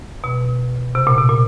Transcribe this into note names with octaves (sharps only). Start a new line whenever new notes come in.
B2
C3
A#2
C3
A#2